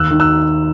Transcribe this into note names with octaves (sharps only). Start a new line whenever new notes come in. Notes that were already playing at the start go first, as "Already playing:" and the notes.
Already playing: D#2 E6 F#6
D#3
E6 F#6